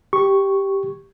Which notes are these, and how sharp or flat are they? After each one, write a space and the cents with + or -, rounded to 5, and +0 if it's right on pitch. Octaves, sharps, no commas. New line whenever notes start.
G4 +0 C#6 +0